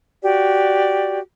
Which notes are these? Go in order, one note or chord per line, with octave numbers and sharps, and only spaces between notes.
F#4 G4 D5